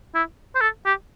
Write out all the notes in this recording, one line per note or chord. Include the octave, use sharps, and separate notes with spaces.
E4
C5
A4
G4